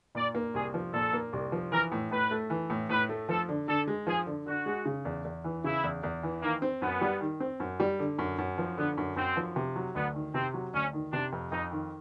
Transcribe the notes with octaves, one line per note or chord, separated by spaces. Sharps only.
A#2 D5
A#3
C2 G#4
F3
A#2 A4
A#3
C2
F3
E3 A#4
A2
A2 B4
A3
E3
A2
A2 B4
A3
F3 A4
D3
D3 A4
G#3
F3 G#4
D3
D3 F#4
G#3
C#3
E2
E2
E3
C#3 E4
E2
E2
E3
D#3 A#3
C4
F#2 B3
G3
D#3
C4
F#2
G3
D3
F#2
F#2
F3
D3 B3
F#2
F#2 C4
F3
C3
F#3
D2 B3
D#3
C3 C4
F#3
D2 C#4
D#3
C3 D4
F2
F2 D#4
D#3